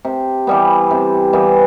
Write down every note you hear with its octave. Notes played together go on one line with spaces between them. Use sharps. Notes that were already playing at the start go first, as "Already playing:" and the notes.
C3
E3 G3 B3
C3
E3 G3 B3